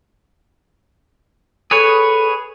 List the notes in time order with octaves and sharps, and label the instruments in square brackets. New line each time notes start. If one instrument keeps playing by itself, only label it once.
[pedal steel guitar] G#4 B4 C#5 [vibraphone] A4